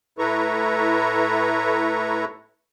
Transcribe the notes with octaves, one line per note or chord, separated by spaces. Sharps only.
A2 E4 A4 B4 A#5 C#6